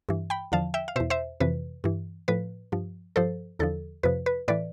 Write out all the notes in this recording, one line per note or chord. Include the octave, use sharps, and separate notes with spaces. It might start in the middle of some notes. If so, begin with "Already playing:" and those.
G2 E3
G5 B5
E2 D3 F3 F5 A5
E5 G5
F5
E2 B2 C5 E5
C5 E5
F2 C3 E3 B4
G2 E3
A2 F3 B4
G2 F3
G2 F3 A4 C5
E2 D3 F3 A4
F2 C3 F3 B4
B4
A2 E3 B4 D5